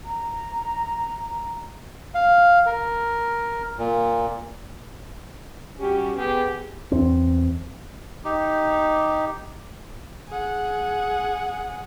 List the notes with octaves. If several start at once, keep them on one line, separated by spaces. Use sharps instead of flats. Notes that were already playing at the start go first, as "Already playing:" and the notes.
A#5
F5
A#4
A#2
G3 C#4 F#4 G4
B3 G4 G#4
E2 C4
D#4 G4
G#4 F#5